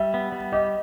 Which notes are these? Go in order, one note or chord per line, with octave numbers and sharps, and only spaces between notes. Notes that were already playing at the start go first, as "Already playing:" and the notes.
Already playing: G3 E5
B3
G3
G4 D#5